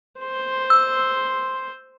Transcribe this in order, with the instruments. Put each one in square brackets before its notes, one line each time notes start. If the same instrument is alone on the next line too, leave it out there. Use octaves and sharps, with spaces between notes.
[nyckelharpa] C5 C6
[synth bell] E6